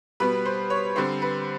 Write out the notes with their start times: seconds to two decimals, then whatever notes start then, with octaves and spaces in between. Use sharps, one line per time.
0.20 B2 G3 B3 B4
0.46 C5
0.70 C#5
0.96 D3 G3 C4 C5
1.22 B4